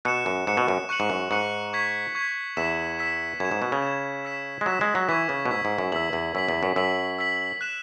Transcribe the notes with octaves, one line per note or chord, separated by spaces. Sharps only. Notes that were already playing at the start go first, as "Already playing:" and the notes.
B2 F#6 C#7 E7
F#2
G#2 F#6 C#7 E7
B2
F#2
C#6 F#6 C#7 F#7
G#2
F#2
G#2 C#6 F#6 C#7 F#7
C#6 G#6 B6
C#6 G#6 B6
E2 E6 B6 E7
E6 B6 E7
F#2 G#6 E7
G#2
B2
C#3
G#6 E7
E6 B6 E7
G#3
F#3 E6 B6 E7
G#3
F#3
E3 C#6 E6 G#6 B6
C#3
B2
G#2 C#6 E6 G#6 B6
G#2
F#2
E2 E6 B6 F#7
E2
F#2 E6 B6 F#7
E2
F#2
F#2 E6 B6 F#7
E6 B6 F#7
F#6 E7